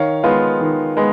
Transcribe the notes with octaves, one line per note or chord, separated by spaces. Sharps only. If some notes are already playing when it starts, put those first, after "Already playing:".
Already playing: D#3 C#5 F5
G#3 B3 F4
D#3
G#3 B3